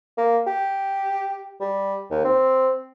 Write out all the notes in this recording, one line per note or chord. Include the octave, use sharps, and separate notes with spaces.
A#3
G4
G3
D#2
C4